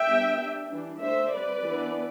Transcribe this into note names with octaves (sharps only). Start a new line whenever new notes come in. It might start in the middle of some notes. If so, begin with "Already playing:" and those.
Already playing: E5 G5
G3 B3 D4
G3 D4
E3 G3 D4
D3 A3 D4 C5 E5
G3 C4 B4 D5
E3 B3 D4